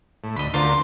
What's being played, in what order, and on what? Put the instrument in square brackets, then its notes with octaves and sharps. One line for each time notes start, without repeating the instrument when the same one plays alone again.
[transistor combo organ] A2
[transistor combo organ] D2 [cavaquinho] D#5 B5
[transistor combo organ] D2 D3 A#4 [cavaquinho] F4 C5